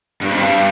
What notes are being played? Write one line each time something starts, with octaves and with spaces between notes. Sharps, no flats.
G2
F2
G2